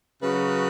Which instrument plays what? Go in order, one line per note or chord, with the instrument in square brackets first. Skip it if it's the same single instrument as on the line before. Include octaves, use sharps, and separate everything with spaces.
[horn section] C#3 F#3 C#4 F#4 [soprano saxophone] B4